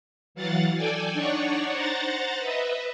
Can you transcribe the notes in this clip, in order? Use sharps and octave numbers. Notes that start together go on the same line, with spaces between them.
E3 F#3 F5 F#5 A6
A4 D5 G5 G#5
D4 D#4 C#5 D5 F#5 C#6
C5 F#5 A#5 A6
B4 D#5 E5